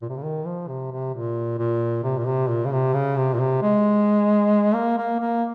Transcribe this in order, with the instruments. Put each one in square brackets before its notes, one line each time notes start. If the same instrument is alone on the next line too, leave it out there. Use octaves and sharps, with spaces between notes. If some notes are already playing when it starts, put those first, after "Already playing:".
[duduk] A#2
C3
C#3
D#3
F3
C3
C3
A#2
A#2
C3
A#2
C3
A#2
C#3
C3
C#3
C3
A#2
C3
G#3
A#3
A#3
A#3